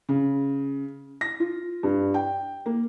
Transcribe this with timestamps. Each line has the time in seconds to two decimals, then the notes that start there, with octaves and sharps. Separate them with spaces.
0.09 C#3
1.21 A#6
1.40 F4
1.83 G2
2.14 G5
2.66 A#3